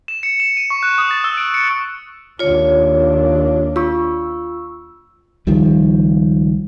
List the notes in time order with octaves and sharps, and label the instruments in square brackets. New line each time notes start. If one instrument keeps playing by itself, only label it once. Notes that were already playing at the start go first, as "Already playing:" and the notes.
[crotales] E7
C#7
E7
D#7
C#6
F#6
D#6
A6
E6
D7
C#7
[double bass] D#2 D4 [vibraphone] F4 C#5
[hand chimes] F4 C#6 [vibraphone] E6
[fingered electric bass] C#2 D#3 F3 G3